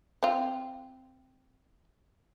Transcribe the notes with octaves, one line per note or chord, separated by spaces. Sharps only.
C4 F4